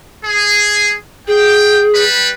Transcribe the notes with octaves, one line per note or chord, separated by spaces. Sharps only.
G#4
G#4 G5
G3 B4